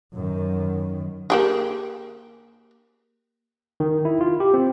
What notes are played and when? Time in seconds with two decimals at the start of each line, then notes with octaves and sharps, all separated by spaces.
0.14 F#2 D#3
1.30 A#3 G4 G#4
3.80 D#3
4.05 E4
4.21 F4
4.40 G4
4.54 C4